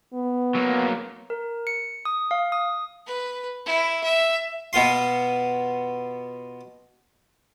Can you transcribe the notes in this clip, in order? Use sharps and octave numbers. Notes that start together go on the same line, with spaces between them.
B3
F#3 A#3
A#4
C#7
D#6
F5
D#6
B4
E4
E5
B2 B3 F4 C6